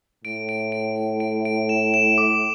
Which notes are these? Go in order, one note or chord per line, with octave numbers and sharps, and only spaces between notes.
A2 D7
D7
D7
D7
D7
D7
E7
E7
D6